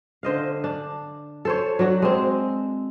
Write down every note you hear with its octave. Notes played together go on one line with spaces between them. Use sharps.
D3 C5 D#5 F5
D4
A4 C5 C#5
F#3 D4 F#4
G#3 C4